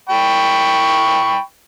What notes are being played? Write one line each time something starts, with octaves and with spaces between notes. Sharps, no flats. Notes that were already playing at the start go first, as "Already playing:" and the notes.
G5 B5 C#6